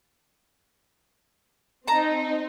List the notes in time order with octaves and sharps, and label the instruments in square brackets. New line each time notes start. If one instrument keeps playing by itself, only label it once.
[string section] C4 D#4 [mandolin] A5 A#5